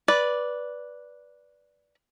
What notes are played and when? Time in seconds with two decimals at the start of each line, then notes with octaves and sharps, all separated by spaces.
0.08 B4 D5